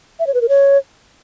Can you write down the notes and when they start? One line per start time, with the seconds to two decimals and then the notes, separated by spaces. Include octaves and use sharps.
0.19 E5
0.27 C#5
0.34 B4
0.41 A#4
0.49 C#5